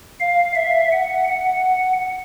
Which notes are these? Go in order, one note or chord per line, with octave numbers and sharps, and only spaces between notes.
F5
E5
F#5
F#5